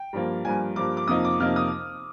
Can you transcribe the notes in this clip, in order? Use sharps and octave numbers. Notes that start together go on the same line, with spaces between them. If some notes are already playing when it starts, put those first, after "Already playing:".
Already playing: G5
G2 F3 A#3
G2 F3 A#3 G#5
G2 F3 A#3 D6
D6
F2 C3 F3 A#3 D#4 D#6
D6
F2 C3 F3 A#3 D#4 F6
D#6